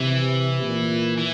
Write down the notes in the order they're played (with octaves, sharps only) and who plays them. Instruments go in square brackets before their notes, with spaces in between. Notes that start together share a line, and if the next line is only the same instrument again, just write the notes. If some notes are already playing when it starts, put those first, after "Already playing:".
Already playing: [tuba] C3 [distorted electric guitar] E3
[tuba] A#2
[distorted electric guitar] E3